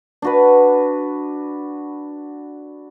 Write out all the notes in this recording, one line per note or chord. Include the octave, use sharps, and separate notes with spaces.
D4 F#4 B4